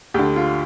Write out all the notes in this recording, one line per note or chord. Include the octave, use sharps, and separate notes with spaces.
D2 D3 G4
F4